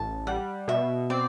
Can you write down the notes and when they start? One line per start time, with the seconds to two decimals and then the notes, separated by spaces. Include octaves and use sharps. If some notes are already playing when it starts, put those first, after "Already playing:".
Already playing: A1 A5
0.27 G3 F#5
0.68 B2 E5
1.10 C4 D5